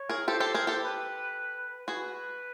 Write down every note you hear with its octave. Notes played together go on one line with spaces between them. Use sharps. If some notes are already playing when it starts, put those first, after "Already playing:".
Already playing: C#5
G#4 A#4
G4 A4 C5
G4 A4
G#4 A#4
G4 A4
B4
F#4 G#4 B4